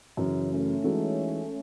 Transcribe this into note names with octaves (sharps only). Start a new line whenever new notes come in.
F#2 C#3 E3
A3 C#4
E3 G#3 D#4 F#4 A4